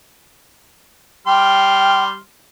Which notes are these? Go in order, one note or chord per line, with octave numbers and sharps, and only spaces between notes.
G3 G5 C6 F6